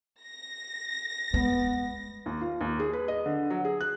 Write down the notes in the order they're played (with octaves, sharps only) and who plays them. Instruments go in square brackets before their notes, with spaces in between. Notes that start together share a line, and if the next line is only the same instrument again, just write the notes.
[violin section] A#6
[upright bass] G#3 [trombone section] B3
[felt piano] D#2
F4
D#2
G#4
B4
D#5
D3
F#3
G#4
F#6